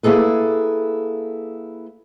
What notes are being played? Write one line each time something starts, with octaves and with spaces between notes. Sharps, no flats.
A#3 E4 G#4 A4 B4